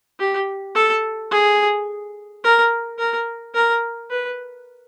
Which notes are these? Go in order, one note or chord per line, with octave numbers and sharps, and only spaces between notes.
G4
A4
G#4
A#4
A#4
A#4
B4